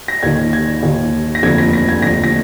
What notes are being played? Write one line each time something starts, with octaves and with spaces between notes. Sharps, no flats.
A#6
D#2 D#3 G#6
G#6
D#2 D#3
A#6
F1 D#2 D3 F3 G#6
A#6
A#6
G#6
F1 D#2 D3 F3 A#6
A#6